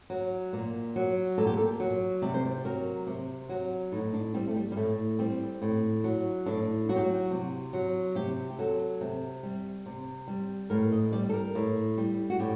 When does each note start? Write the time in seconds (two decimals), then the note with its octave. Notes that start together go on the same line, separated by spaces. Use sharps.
0.10 F#3
0.53 A#2
0.96 F#3
1.38 A#2 A4
1.47 G4
1.57 A4
1.80 F#3
2.22 C3 D5
2.34 C5
2.45 D5
2.65 F#3 A#4
3.07 C3
3.49 F#3
3.92 A2 D#4
4.13 D4
4.34 G3 C4
4.48 A3
4.56 G3
4.72 G3
4.77 A2 A3
5.19 G3 C4
5.62 A2
6.04 F#3
6.46 A2 D4
6.89 F#3 F#4
6.96 G4
7.03 F#4
7.31 C3
7.73 F#3
8.15 C3 G4
8.50 G4
8.58 F#3 A4
9.01 C3
9.43 G3
9.86 C3
10.28 G3
10.70 A2 A#4
10.92 D#5
11.12 G3 D5
11.29 A4
11.33 A#4
11.55 A2
11.98 G3
12.30 F#4
12.40 A2 G4